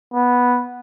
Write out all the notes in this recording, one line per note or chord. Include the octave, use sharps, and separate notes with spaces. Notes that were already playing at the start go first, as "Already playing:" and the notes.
B3